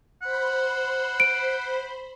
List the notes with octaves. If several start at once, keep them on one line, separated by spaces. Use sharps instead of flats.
C5 F#5 B5
D7